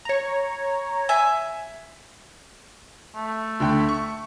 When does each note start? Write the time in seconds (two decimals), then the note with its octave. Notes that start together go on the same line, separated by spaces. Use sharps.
0.05 C#5 A#5
1.09 E5 G#5
3.15 A3
3.60 D2 D3 G5
3.89 C#6